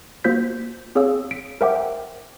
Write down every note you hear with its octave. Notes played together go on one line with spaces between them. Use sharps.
A#3 F4 F#4 C5 G6 B6
C4 G#4 C#5 F5 E6
B6 D7
A#4 C5 E5 F#5 G5 D6